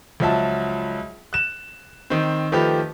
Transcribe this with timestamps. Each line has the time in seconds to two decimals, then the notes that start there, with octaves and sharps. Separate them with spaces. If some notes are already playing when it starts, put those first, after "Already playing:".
0.20 C#2 F3 F#3 E5 A5
1.33 F#6 E7
2.10 D#3 C4
2.52 D#3 F3 A3 G4 B4